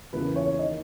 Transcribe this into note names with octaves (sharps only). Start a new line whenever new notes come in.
E2 C#3 E3 A#3 B4
C#5
D#3 A#3 D#5